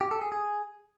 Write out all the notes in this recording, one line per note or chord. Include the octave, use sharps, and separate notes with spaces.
G4
A4
G#4
G#4